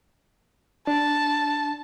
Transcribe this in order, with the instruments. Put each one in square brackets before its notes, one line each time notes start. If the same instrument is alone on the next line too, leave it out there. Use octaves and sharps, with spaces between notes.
[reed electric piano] D4 [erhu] A5